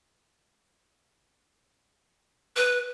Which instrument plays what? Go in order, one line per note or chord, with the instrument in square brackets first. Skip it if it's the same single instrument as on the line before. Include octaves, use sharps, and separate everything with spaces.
[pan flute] B4